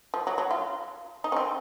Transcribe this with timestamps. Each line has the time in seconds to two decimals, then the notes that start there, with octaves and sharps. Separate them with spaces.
0.14 F3
0.27 F#3
0.38 F#3
0.51 F4
1.24 D#4
1.32 C#4
1.37 C4